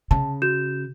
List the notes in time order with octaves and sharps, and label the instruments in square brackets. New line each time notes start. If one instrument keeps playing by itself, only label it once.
[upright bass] C#3 [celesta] A5
[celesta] F#4 G6 E7